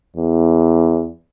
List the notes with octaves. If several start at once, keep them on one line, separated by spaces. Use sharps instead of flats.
E2